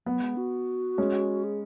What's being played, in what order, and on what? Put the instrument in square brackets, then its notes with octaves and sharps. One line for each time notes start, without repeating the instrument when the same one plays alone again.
[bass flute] F#3 [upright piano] B3
[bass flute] G#3
F#4
[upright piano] G#3 C#4
[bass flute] G#4